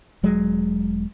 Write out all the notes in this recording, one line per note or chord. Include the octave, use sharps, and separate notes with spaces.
E1 F#3 G#3